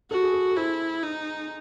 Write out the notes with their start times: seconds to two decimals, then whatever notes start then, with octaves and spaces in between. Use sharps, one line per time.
0.11 F#4 A4
0.23 G#4
0.33 A4
0.51 A4
0.56 E4 C5
1.02 D#4